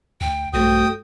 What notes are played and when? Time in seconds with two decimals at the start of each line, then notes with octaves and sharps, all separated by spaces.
0.21 D2 G5
0.53 A#1 G2 A3 C4 F#4 G5 D#6